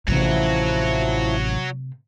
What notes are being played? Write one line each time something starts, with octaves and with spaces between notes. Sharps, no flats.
A1 A2 C3 F3 F#3 E4 F#4